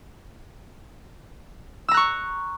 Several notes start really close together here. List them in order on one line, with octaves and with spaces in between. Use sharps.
E6 A#5 F#6 C#6